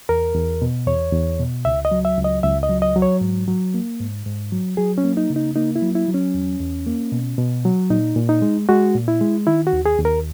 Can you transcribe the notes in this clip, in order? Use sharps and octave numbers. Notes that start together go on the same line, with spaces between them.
E2 A#4
E2
B2
E2 C#5
E2
B2
C#2 E5
D#5
F#3
E5
C#2
D#5
C#2 E5
D#5
F#3
D#5
F#3
C#5
G#2
F#3
A#3
G#2
G#2
F#3
F#3 G#4
C#4
A#3
D#4
C#3
D#4
A#3 D#4
E4
F#3
E4
F#3
C#4
E2
E2
A#3
B2
B2
F#3
A#2 D#4
A#2
D#4
G#3
G#3 F#4
A#2
E4
G#3
D#3 E4
F#4
D#2
G#4
D#2
A#4